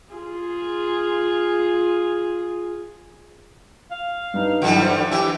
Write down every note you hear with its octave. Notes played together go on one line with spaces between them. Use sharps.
F4 G#4
F5
G2 D#4
D3 E3 F#3 G3 E4
C5
E3 G4 E5